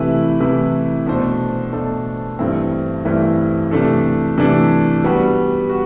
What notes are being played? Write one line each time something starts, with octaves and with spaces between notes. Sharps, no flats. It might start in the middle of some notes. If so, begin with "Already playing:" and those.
Already playing: C3 E3 A3 E4 B4
C3 E3 A3 E4 B4
B2 A3 D4 A4 C5
B2 A3 D4 A4 C5
G2 E3 A3 C4 E4
G2 E3 A3 C4 E4
C3 E3 A3 D4 A4
C3 E3 A3 D4 A4
G3 B3 F#4
F#4